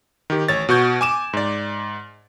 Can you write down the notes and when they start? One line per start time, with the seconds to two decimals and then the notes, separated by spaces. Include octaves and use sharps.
0.30 D#3 G4
0.48 A1 C#5 A6
0.69 B2 F#4 C#6 G6 G#6
1.01 G#5 D6 E7
1.33 G#2 D5